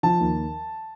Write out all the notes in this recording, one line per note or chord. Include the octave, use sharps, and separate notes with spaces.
F3 A5
D#2